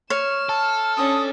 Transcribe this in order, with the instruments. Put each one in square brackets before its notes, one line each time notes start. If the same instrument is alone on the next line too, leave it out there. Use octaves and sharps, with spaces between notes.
[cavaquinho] C#5 [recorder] F6 [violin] E7
[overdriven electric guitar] A4
[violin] C#4 D4 [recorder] D#6